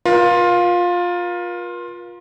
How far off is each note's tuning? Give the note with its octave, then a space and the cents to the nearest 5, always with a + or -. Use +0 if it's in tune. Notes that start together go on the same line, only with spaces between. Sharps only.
F4 +15 A#4 +45